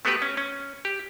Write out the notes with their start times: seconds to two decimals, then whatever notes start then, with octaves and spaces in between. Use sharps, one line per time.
0.05 A3 B3 F#4 G4 B4
0.22 C#4
0.37 C#4
0.85 G4